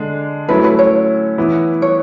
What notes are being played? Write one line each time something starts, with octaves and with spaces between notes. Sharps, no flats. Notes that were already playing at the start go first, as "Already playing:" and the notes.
Already playing: D3 G#3 D4
F#3 A3 C#4 E4 B4
B4
C#5
E3 B3 E4
C#5